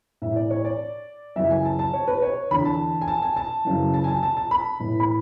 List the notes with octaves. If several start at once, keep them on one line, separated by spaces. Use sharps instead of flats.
A2 E3 E5
D5
C#5
D5
F#2 C#3 E3 E5
G#5
A5
A5
C#5
B4
C#5
E2 D3 B5
A5
G#5
A5
G#5
A5
F#2 C#3 E3
A5
G#5
A5
A5
A5
B5
A2 E3
B5